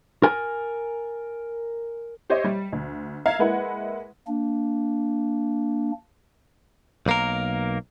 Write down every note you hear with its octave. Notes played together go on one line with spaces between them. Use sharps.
A#4 G#5
G4 C5 C#5 D#5 E5
G3
D2
E5 F5 A#5 G#6
G#3 A#3 E4 B4 F#5
A#3 D4
B1 A#3 A#4